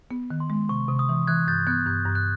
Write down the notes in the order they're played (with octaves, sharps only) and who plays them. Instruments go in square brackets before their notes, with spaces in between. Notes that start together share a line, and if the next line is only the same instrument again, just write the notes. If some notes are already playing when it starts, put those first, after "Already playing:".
[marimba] B3
D#3
[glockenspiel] C6
[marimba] G#3
[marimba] C3 [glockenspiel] C#6
[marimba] C3
[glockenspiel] D#6
[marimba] E3
[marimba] E3 [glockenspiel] F#6 G#6
[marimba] G2 [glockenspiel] G6 A6
[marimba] B3 [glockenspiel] F#6 G#6
[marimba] G2 [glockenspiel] G6
[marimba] G2
[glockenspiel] F#6